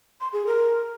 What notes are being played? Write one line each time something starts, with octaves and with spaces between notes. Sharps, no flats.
C6
G#4
A#4